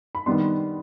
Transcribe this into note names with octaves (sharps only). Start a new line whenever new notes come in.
B5
D#3 G3 B3 D4 C6